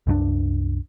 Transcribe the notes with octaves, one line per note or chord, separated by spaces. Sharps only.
C2 F#2 C4 D4